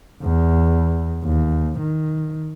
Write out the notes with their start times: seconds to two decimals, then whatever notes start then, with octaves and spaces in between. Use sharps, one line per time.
0.23 E2
1.24 D#2
1.79 D#3